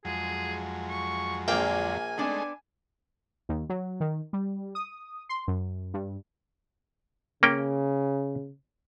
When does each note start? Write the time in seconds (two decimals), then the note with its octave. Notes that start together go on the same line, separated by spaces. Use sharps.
0.05 F2 F#3 G#3 G#4
0.89 C#6
1.48 A#1 D3 A#3 C5 D5 G5 G#5
2.18 G#3 A3 B3 C4 D4 D#4
3.49 D#2
3.70 F#3
4.00 D#3
4.33 G3
4.75 D#6
5.29 C6
5.48 F#2
5.94 G2
7.43 C#3 A#3 C#4 G5